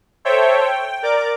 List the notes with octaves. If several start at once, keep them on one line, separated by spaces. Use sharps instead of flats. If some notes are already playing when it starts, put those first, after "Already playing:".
A4 C5 C#5 E5 G5
G5
A#4 D5 D6